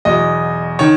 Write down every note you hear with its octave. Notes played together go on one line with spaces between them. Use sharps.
E2 B2 F#3 D#5
D#3 C#5